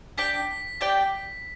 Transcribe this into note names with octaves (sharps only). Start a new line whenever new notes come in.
D4 G4 D5 G5 B6
D4 G4 D5 G5